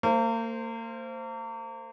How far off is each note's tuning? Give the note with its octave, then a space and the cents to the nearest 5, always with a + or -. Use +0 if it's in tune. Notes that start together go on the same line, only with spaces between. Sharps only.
A#3 -40 C5 +0